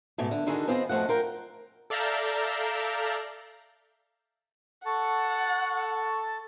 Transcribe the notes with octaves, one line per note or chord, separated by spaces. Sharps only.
G#2 B2 A3
D3
D3 D#3 D#4 F#4 G#4 A4
B3 C4 F4 G#4 D5 D#5
F#2 F3 A3 D#5 F#5
F4 A#4 G5
A4 D5 E5 F5 A#5 G6
A4 F#5 A5 C#6